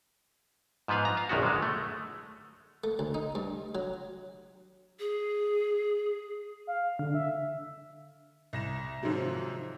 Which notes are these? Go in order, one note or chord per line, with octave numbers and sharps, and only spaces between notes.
G#2 F3 B3 B4 F5
A#5
F5
A#1 F#2 D#3 B3 F#4
D3 G#3
A3
A3
D2
D#4
G2
F#3
G#4
F5
D3
E5
C2 A#6 E7
G#2 C3 D#3 F3 F#3